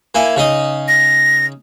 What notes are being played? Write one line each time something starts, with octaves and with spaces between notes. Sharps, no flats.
A#3 E4 G#5
C#3 D#4 D#5
A#6